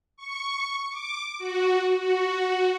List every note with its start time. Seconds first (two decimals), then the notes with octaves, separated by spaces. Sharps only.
0.17 C#6
0.90 D6
1.39 F#4
1.99 F#4